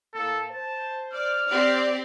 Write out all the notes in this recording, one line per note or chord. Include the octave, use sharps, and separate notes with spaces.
A2 A#3 A4
C5 A5
D5 F6
C4 G4 D5